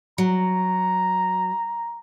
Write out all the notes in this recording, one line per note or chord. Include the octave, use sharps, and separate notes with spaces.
F#3 A#5